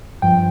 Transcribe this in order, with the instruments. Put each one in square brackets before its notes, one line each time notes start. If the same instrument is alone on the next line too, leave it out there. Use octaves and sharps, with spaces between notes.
[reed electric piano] G2 F3 G5